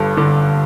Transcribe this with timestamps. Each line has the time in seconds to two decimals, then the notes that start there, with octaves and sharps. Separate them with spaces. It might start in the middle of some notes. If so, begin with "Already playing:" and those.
Already playing: G1 G2 A4
0.17 D3